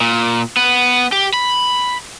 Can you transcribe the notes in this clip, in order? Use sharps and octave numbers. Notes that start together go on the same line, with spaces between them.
A#2
B3
G4
B5